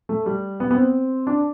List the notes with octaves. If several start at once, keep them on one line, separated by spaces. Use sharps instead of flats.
A3
G3
B3
B3
C4
D4